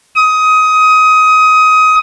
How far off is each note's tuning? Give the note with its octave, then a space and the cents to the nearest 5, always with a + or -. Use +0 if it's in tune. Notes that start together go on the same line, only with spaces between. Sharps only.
D#6 +20